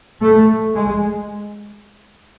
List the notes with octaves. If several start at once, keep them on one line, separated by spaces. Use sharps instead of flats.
A3
G#3